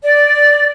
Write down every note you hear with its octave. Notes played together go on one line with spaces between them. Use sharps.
D5